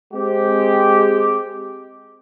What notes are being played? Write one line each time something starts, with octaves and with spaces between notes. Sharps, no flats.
G#3 C4 G4